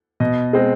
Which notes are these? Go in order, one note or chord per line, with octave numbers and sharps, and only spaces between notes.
B2 D#5
G#3 C4 D#5